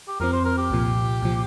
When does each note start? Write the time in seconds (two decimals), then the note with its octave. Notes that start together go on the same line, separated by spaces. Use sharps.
0.08 G4
0.20 F2 F3 C4 A#4
0.33 C5
0.45 A#4
0.58 G4
0.70 C2 A#2 F3
1.21 C2 A#2 F3